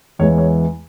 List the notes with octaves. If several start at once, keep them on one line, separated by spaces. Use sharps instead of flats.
E2 E3 G#3 C#5
C#5